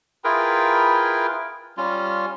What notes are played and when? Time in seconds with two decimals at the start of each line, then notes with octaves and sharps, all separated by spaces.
0.24 E4 F4 G#4 A#4 B4 G5
1.77 G3 C#4 F4